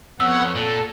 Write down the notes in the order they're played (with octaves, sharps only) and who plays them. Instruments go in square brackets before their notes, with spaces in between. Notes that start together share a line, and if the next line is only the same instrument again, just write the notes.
[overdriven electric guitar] F2 [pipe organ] B3 C#5 F#5 [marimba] E6
[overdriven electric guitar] A#2 [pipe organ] A4